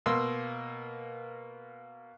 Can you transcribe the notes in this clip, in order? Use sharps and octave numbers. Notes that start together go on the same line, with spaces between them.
B2 A#3 C6 E6